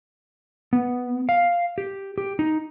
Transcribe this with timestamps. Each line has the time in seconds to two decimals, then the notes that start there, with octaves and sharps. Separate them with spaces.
0.73 B3
1.29 F5
1.78 G4
2.18 G4
2.39 D#4